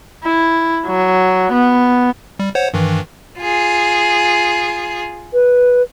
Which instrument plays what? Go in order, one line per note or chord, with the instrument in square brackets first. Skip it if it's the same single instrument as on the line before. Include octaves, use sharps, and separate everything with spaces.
[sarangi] E4
F#3
B3
[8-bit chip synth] G3
C5 C#5 F#5
G2 D#3 E3
[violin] F4 G#4
[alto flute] B4